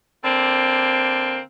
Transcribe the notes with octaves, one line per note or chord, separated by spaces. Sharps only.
D3 A#3 C4